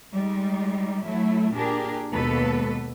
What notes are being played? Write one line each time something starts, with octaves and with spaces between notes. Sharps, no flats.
G3 G#3 D#4
F#3 A3 E4
A#2 D4 G4 G#4 A#4
D#2 B2 G#3 A#3 A4 B4